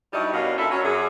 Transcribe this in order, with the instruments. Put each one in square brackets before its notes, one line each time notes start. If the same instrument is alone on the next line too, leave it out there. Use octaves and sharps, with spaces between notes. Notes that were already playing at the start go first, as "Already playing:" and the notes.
[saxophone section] G2 G3 D#4 E4 F#4
F#2 B2 C#4 D4 F5
A#2 E4 A4 E5
F#3 C#4
F#2 G#4